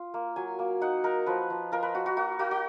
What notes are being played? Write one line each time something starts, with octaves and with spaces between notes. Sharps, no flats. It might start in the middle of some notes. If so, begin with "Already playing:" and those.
Already playing: F4
A#3
F#3 G#5
A#3
D#4 F#5
D#4 A#4
F3 B4
F3
F4 A#4
B4
F4 F#4
F#4
A#3 F#4
A#3 F#4
F#4